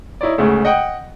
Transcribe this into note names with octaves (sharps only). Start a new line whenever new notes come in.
D#4 E4 C#5 D5
D2 G#2 C#3 A3
D#5 F#5 G5